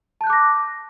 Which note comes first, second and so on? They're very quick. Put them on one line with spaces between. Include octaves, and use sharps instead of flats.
A5 G6 F#6 D6 A#6